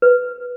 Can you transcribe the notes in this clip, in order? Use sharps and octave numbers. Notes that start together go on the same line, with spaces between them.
B4